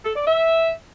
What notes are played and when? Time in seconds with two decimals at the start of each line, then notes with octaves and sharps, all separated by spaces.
0.05 A4
0.16 D5
0.27 E5